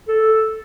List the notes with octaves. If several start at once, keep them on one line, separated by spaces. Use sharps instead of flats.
A4